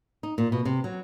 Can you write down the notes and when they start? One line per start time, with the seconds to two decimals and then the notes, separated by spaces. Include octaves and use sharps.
0.23 D#4
0.38 A#2
0.52 B2
0.65 C3
0.84 F#3